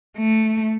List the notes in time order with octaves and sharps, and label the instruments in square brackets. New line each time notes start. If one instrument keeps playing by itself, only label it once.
[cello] A3